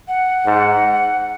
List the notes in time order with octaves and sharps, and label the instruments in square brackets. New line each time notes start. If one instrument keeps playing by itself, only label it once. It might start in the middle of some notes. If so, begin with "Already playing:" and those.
[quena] F#5
[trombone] G#2